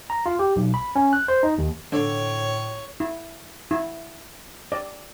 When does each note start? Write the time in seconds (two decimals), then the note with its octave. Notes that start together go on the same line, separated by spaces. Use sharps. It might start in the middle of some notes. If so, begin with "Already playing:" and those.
0.10 A#5
0.26 F4
0.39 G4
0.56 B1
0.74 B5
0.95 C#4
1.13 F#6
1.28 C5
1.43 D#4
1.58 D#2
1.92 A2 D3 C#5
3.00 E4
3.71 E4
4.72 D5